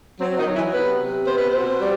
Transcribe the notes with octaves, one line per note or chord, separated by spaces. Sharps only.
F#3 C4
C4
D#3 D#4
F#3
E3 E4
C3 B3 B4
C3
B3 C5
B4
B2 C4 C5
G3